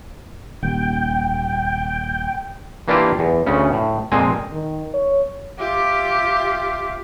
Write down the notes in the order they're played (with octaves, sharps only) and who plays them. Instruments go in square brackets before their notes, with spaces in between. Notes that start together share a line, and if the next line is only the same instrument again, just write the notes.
[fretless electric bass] D#1 D#2 [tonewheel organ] G5
[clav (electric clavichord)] E3 A#3 D4 E4 F4 G4
E2
D2 C#3 C#4
A2
F2 A#2 G#3 C4 G#5
[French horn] D#3
C#5
[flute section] F4 E5 D6 [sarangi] G4